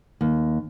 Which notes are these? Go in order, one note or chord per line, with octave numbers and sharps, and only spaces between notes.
D#2